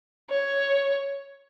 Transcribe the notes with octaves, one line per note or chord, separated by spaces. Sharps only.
C#5